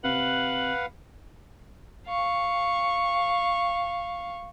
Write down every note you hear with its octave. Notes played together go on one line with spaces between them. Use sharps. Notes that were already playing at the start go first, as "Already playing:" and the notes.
C3 B4 F5 F#5 F#7
F5 C#6